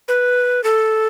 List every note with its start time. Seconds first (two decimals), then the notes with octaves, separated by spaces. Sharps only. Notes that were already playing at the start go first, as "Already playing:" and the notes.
0.08 B4
0.64 A4